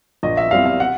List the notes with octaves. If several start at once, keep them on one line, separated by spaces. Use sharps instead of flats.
A#1 D#5
E5
A#2 G3 C4 E4 F5
F5
F#5